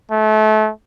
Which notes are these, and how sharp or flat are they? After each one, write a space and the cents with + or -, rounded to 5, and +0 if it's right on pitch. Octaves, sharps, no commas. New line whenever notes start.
A3 -30